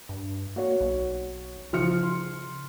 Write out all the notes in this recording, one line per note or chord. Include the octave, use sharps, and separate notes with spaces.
G2
A#3 F#4 C#5
B1
C#3 F3 F6 C#7
C6